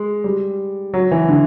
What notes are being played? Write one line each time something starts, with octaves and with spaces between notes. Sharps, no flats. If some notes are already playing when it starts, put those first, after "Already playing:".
Already playing: G#3
G3
F#3
E3
D3